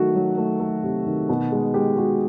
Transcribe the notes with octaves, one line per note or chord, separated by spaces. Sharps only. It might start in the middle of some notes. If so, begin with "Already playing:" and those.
Already playing: D#3 F#3 A3 F#4 A4
F#3
A3
A3
C3
D#3
B2
G#3
G#3 G4
G#3 F#4